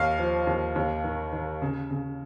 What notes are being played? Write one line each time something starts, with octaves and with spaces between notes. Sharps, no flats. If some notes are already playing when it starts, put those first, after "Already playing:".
Already playing: D#2 F5
F3
D#2
D#2
D#3
D#3
C#3
C#3